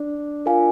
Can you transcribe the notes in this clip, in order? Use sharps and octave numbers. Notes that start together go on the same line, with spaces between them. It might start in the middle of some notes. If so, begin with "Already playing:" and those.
Already playing: D4
F4 A#4 F5 G#5